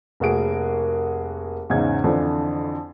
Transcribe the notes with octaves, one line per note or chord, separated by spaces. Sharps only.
F1 A#3 F#4 G#4 D7
E2 G#2 C#3 D#4 G#6
F2 D3 E3 F3